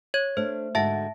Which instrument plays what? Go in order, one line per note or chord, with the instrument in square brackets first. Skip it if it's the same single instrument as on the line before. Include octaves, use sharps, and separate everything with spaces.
[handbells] C#5 G#6
[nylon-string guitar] A3 D4 [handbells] C5
[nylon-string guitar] G#2 D3 F#4 [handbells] E5 A5 A#6